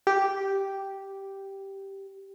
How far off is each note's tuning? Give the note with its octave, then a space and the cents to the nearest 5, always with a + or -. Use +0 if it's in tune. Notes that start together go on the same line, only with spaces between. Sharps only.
G4 -5